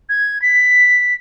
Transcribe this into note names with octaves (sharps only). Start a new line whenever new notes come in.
G#6
B6